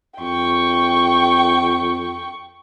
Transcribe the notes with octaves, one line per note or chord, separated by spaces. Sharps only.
F2 G5 C#6